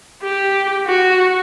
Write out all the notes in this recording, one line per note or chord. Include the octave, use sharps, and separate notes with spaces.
G4
F#4